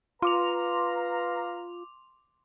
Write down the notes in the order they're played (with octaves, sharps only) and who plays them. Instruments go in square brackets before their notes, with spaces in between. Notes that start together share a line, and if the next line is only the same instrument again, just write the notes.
[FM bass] F4 [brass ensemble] B4 F5 A#5 [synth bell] C6 D6 F7